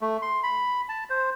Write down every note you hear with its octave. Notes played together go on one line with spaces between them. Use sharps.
A3
C6
B5
A5
C5